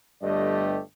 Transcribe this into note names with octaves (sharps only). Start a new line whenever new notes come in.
G1 G2 A3 G4 D5 D#5